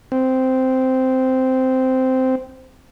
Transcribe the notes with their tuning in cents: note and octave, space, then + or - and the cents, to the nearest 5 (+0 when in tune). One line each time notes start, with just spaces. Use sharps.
C4 -10